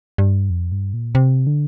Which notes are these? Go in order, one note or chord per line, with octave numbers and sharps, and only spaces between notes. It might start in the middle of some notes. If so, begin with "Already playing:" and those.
G2
F2
G2
A#2
C3
D3